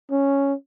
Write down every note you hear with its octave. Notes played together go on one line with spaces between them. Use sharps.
C#4